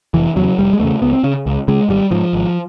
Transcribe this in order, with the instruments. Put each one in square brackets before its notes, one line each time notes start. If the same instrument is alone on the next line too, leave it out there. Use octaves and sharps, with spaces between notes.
[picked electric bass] F1 E3
E2 C#3 F#3
F1 G3
G#3
E2 C#3 A3
C#2 B3
C4
C#3 C#4
C#2
C#3 G#3
G#1 G3
G#2 F3
G#1